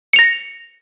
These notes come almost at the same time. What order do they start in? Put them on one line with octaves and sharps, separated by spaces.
C#7 F7 A#6